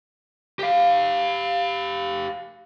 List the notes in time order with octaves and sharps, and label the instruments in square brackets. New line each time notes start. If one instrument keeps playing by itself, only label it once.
[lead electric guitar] G4 F5